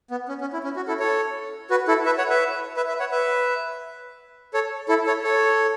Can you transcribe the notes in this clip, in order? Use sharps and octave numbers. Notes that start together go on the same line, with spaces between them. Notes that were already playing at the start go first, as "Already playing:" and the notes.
B3
C#4
C#4
E4
C#4
F#4
E4 A4
A4 C#5
F#4 B4
E4 A4
B4 E5
C#5 F#5
B4 E5
B4 E5
B4 E5
C#5 F#5
B4 E5
A4 C#5
E4 A4
A4 C#5
A4 C#5